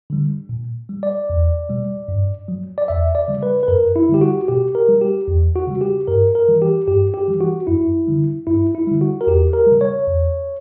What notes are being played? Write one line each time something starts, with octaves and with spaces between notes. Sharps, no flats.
D3 G3
A#2
G3
D5
E2
B2 G3
G2
F#3
D5
E2 E5
D5
C#3 G3
B4
B4
F#2 A#4
E4
D3 G3 G4
F#4
B2 G4
A#4
G3
G4
E2
F#4
C#3 G3
G4
G2 A#4
A#4
E3 G3
G4
G2 G4
G4
E3 G3
F#4
F#2 E4
D3 G3
G2 E4
E4
D3 G3
F#4
A#4
E2 G4
A#4
C#3 G3
C#5
E2